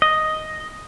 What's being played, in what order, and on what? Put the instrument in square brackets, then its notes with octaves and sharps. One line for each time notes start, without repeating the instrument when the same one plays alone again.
[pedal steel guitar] D#5